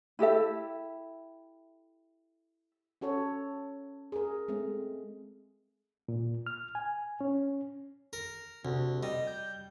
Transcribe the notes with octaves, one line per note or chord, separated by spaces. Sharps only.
E4 G4 A4 E5
C#4 F#4 A4 C#5
G#4 A#4
G#3 A3 C4
A#2
F6
G#5
C#4
A#4
D2 C3
G3 D#5
G6